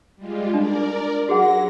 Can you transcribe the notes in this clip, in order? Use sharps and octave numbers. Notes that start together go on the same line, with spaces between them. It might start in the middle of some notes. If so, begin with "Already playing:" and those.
G3 G#3 F4
D4 A#4 D5
F#3 F#4 G#4 F#5 A#6